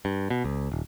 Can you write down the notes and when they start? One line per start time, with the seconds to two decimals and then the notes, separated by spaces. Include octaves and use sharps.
0.05 G2
0.30 B2
0.44 C#2
0.72 D#1